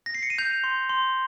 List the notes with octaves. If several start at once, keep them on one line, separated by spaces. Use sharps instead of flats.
A#6
C7
C#7
D#7
G6 F7
C6
C6